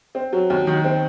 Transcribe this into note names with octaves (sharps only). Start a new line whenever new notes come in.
C4
F#3
D#2
D#3
C4